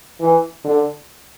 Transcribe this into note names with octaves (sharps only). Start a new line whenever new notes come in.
E3
D3